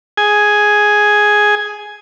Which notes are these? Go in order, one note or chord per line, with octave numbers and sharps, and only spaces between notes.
G#4 G#5